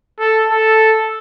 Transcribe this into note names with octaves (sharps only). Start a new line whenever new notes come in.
A4
A4